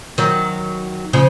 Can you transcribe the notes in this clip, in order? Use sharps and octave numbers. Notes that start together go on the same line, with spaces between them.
D#3 F#3
C#3 F3